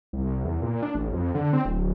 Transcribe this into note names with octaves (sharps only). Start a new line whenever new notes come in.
C2
E2
A#2
D4
A1
F2
D3
C4
D1